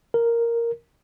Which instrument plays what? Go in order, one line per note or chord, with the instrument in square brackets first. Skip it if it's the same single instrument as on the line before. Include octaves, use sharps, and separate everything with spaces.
[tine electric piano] A#4